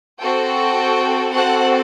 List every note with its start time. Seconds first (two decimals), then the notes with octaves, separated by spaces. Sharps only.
0.21 C4 F#4 A4 G5
1.34 C4 F#4 A4 F#5